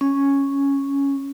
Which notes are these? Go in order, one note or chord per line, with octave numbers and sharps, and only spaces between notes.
C#4